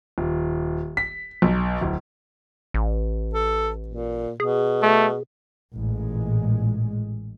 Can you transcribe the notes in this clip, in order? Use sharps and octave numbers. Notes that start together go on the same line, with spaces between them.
D#1
B6
B1
D1
A1
A4
A#2
B2 G#4
A3
A1 A#2 G#3